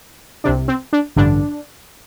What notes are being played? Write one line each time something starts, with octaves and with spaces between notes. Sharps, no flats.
C2 C3 D4
C4
D4
A1 G2 D3 D4